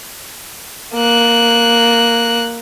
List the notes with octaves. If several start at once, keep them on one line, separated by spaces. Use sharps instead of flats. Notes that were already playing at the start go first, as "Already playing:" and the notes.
A#3 F#6